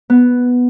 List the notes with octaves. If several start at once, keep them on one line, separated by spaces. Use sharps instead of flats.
B3